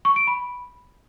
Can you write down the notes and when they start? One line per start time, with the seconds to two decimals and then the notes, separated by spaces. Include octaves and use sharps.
0.05 C#6
0.16 D7
0.27 B5